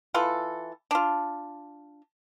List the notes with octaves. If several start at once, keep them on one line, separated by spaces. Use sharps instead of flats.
E3 F4 A4
D4 F4